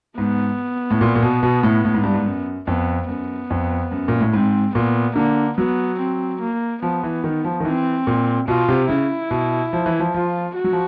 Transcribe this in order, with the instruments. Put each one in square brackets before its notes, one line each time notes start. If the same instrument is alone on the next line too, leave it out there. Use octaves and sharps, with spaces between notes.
[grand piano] G#2 [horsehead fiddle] B3
[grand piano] A2
A#2
A#2
B2
B2
A2
A2
G#2
G2
G#2
F#2
[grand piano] F2 [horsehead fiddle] B3
[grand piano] F#2 [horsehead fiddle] B3
[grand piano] F2
F#2
A#2
A2
[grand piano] G#2 [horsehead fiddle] C4
[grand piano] A#2 [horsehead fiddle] B3
[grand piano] D3 [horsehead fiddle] A#3
[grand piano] F#3 [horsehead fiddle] B3
[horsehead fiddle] C4
A#3
[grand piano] F3 [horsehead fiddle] B3
[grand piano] E3
D#3
F3
D#3
[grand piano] E3 [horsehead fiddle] C4
[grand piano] A#2
[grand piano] B2 [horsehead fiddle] F4
[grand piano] C3
[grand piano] C#3 [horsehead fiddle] E4
[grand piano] B2
F3
E3
F3
[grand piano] F3 [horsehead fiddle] F4
[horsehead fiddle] F#4
[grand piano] F#3
F3